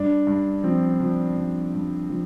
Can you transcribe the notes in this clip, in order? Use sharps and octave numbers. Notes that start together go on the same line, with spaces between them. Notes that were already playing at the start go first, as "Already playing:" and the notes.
Already playing: G2 D4
G2
F3 C4
F3
G2
G2
F3